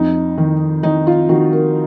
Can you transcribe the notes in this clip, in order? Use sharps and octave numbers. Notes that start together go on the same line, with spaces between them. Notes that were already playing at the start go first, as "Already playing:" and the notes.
Already playing: F2 D#4
D#3
D#3 D#4
F4
D#3 F#4
A#4